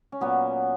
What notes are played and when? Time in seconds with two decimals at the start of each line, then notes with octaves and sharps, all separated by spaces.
0.12 C#4
0.21 A#2 F#3 B3